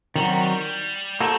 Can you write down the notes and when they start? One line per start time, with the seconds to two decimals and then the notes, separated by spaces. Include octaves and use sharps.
0.15 D#3 F#3 G3 C4 F#4
1.20 A3 A#3 F#4 A4 C5